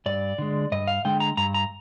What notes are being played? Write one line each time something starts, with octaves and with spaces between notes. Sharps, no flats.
G2 D5
D3 G#3
G2 D#5
F5
D3 G#3 G5
A#5
G2 A#5
A#5